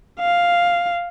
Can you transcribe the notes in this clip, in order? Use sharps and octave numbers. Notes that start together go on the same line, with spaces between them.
F5